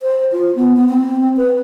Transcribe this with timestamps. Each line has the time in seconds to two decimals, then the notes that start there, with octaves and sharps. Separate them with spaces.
0.02 C5
0.32 F4
0.56 B3
0.77 B3
0.89 C4
1.37 B4